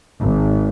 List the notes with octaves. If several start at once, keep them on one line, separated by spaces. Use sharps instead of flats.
G#1